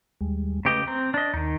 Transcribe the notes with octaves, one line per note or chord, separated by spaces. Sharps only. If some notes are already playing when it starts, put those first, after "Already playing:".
D#2 G3 G#3
C#3 A3 G4 B4 D#5
C4 A#5
D4 D#5
D#2 D#3 D#4